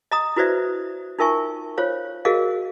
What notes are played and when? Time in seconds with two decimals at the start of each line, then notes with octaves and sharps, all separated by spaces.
0.11 D#5 A#5 D#6
0.36 E4 F#4 B4 C5 D5 E5
1.19 D#4 F4 A#4 E5 G#5 C#6
1.77 F4 C5 C#5 F5
2.25 F#4 G#4 A#4 D#5 F5